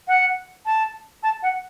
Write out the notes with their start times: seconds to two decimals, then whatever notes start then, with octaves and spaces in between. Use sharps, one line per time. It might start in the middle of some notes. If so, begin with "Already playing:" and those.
0.08 F#5
0.66 A5
1.23 A5
1.43 F#5